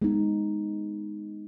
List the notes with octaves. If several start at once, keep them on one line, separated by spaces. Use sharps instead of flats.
G#3 B3 D#4